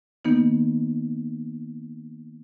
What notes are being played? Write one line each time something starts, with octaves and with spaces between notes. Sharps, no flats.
D#3 A#3 B3 D#4